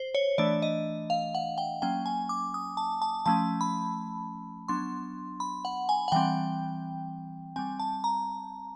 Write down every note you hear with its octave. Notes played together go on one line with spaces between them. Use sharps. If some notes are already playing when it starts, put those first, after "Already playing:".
Already playing: C5
C#5
E3 A3 D4 D5
D#5
F5
F#5
G5
F#3 A#3 C#4 G5
G#5
D6
D#6
A5
A5
F3 A3 C#4 A5
B5
F#3 B3 D4 C6
B5
F#5
G#5
F#5
E3 G3 C4 G5
G3 C4 G#5
A5
A#5